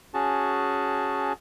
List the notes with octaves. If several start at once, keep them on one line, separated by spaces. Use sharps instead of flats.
C#4 F#4 G#4 A5